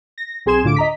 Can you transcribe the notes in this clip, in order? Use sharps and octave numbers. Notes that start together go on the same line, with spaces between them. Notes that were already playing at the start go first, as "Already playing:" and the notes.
A#6
B1 C4 G#4 C6 G#6 E7
D2 A2 D3 F4 D6 D7
D#5 A#5 B6